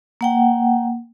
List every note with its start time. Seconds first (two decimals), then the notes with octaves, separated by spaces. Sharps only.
0.21 A#3 F#5 G5